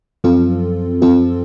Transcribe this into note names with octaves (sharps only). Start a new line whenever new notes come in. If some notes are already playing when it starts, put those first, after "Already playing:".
F#2 F3 C4 F4 A4
F#2 F3 C4 F4 A4